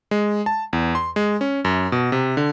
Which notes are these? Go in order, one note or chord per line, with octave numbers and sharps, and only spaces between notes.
G#3
A5
E2
C6
G#3
C#4
F#2
B2
C3
D3